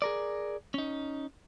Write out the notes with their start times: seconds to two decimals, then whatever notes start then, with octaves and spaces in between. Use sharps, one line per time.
0.02 G#4 A#4 D5
0.74 C#4 D#4